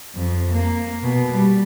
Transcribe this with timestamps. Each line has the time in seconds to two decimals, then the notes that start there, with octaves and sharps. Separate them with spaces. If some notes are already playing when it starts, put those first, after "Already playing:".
0.15 F2
0.52 A#3
1.03 B2
1.32 G3